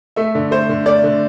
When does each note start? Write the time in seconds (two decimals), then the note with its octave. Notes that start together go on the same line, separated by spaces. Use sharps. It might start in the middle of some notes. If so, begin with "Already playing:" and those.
0.16 A3 E5
0.35 D3
0.51 A3 C5
0.69 D3
0.86 A3 D5
1.04 D3